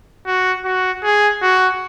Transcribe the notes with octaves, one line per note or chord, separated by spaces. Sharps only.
F#4
F#4
G#4
F#4